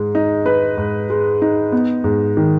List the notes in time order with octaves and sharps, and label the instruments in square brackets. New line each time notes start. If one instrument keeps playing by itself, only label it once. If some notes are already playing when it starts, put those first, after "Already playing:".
Already playing: [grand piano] G#2 G#3
D#4
B4
G#2
G#3
D#4
B3
G#2
D#3